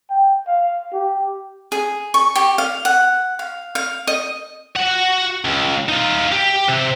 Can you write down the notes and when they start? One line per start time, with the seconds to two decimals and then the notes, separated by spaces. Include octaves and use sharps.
0.10 G5
0.48 F5
0.93 G4
1.72 G#4
2.14 C#6
2.36 G4
2.58 F5
2.85 F#5
3.39 F5
3.75 F5
4.07 D#5
4.76 F#4 F#5
5.45 C#2
5.89 D#4 F4
6.32 G4
6.69 C3